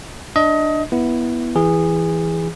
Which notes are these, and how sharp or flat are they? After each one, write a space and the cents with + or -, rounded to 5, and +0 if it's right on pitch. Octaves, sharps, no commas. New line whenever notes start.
D4 +20 D#5 +25
B3 -10 E4 +0
E3 +5 G#4 -20